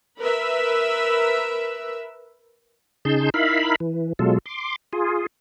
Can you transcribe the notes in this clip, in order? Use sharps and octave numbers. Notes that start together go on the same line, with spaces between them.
A#4 B4 E5
C#3 D#4 G#4 A5 C6 G6
D#4 E4 A#4 E5 F5 B5
E3
B2 F#3 G#3 F4 A4
C6 D6
F4 G#4